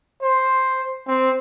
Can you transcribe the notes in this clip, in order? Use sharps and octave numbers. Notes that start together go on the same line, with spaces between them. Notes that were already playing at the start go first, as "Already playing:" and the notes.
C5
C4